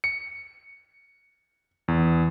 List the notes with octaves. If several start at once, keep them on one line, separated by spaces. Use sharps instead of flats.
C#7
E2